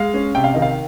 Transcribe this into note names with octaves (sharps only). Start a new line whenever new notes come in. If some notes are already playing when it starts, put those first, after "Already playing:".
Already playing: G#3 F5
C#4
C3 G5
F5
D#3 D#5
F5